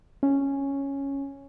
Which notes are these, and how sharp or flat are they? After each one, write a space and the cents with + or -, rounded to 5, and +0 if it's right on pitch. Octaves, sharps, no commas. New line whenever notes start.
C#4 -5